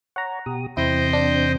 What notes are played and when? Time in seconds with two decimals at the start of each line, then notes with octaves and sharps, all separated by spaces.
0.16 C#5 F#5 A#5
0.46 B2 G4 D#6
0.77 E2 C3 C4 E4 C5 D#5 G5
1.13 D4